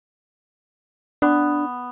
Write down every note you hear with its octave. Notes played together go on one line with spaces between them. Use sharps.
B3 D4